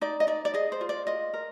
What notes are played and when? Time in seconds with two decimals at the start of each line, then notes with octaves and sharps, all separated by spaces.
0.01 D#4 D5
0.20 D#5
0.27 D#4 D5
0.45 D5
0.54 G#4 D#5
0.72 C5
0.81 F4
0.89 D5
1.07 F4 D#5
1.34 A#4